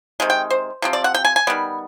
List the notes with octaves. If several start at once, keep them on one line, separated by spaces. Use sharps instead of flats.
C3 D#3 G#3
G5
C5
C3 F3 C4
D5
F#5
G5
G#5
G#5
D#3 G3 B3